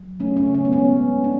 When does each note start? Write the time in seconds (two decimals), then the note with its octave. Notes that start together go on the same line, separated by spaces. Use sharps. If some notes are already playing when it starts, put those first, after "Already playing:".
Already playing: F#3
0.20 A3 C#4
0.37 C#4
0.47 C#3
0.54 C#4
0.65 B3
0.72 G#3 C#4
0.98 G#3
1.24 D4